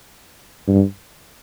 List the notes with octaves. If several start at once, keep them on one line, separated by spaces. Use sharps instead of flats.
G2